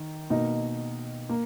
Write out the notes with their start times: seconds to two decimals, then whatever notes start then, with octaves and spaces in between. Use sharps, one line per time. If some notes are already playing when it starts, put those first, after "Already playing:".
Already playing: D#3
0.30 B2 A#3 D#4
1.29 A#3